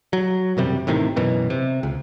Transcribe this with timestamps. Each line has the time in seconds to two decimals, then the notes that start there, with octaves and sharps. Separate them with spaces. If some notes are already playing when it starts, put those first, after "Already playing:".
0.13 F#3
0.57 E1 F#2 C3 G3
0.87 A1 A2 C3 D#3
1.16 F#2 B2 E3
1.50 C3
1.83 C#2